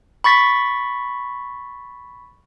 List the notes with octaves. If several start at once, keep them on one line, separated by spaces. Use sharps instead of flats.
B5 C#6 A6 B6